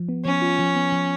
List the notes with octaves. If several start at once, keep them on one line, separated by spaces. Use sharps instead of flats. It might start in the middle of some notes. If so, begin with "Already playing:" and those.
Already playing: F3
B3
F3 C#4
F4
F3
B3
F3